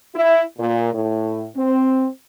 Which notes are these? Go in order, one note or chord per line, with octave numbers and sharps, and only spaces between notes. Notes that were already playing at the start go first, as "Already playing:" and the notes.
E4
A#2
A2
C4